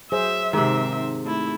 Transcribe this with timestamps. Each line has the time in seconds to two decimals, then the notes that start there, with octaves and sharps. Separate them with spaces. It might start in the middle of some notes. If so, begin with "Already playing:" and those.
0.12 F#3 G#4 C5 E5
0.53 G#2 C3 D#3 C4 E5
1.25 A3 E4